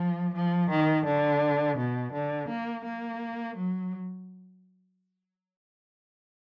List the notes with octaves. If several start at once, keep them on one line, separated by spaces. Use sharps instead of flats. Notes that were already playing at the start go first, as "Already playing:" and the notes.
Already playing: F3
F3
D#3
D3
B2
D3
A#3
A#3
F#3